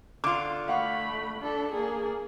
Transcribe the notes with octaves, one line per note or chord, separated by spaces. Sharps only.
D3 F4 D6
A3 F5 F#5 B5 C#6
D4 A4
A#3 G#4